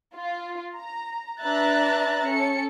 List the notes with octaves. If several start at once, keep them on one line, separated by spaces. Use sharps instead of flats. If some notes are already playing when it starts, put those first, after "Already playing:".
F4
A#5
D4 B4 E5 A#5 F#6 A6
C#4 A4 C#7